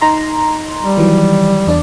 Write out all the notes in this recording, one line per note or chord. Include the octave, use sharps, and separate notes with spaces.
D#4 A#5 C6
G3
D#3 E3 F#3
E2 D4 D5